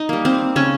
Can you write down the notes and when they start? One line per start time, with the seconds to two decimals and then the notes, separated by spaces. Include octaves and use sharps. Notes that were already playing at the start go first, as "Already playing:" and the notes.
Already playing: D#4
0.09 G3 A#3
0.25 C4
0.56 C#3 C#4